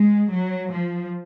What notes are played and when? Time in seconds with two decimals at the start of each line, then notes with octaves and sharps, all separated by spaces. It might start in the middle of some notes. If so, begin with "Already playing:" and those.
Already playing: G#3
0.30 F#3
0.70 F3